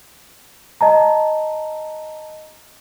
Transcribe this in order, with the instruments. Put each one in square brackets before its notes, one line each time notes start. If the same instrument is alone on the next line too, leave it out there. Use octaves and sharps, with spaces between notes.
[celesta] D#5 A5 A#5